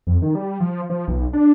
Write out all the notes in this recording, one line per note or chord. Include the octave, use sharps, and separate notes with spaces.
F2
D#3
G3
F3
F3
B1
D4